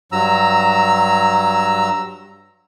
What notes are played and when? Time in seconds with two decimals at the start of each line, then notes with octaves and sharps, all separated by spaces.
0.12 G2 F#3 A#5 E6